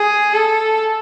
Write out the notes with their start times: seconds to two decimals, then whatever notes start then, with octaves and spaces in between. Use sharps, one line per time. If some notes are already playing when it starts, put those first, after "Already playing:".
Already playing: G#4
0.34 A4